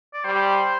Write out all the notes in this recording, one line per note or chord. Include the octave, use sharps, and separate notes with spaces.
D5
G3 C5